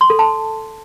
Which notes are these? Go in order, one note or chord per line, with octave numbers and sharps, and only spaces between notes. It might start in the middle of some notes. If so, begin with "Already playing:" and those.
C6
A4
A5